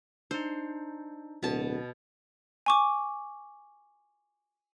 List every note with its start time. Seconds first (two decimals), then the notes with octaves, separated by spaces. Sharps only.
0.31 D4 D#4 C5
1.43 D1 B2 A5
2.66 G#5 C#6 D6